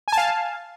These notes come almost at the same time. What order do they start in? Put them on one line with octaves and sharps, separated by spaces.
G#5 A5 F5